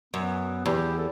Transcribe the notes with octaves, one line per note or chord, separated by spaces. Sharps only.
F#2 B3
E2 G4
A4